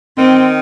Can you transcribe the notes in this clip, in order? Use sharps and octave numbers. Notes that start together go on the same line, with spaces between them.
D#3 C4